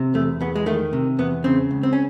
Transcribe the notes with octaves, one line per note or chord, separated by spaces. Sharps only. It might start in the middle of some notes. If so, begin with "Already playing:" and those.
Already playing: C3
E2 A3
E2 B3
G#3
D#3 A3
C3
E2 B3
C#3 C4
C#2
C4
C#4